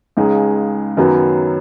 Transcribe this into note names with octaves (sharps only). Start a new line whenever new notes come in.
C#2 C#3 G#3 D#4
F#2 D#3 F#3 B3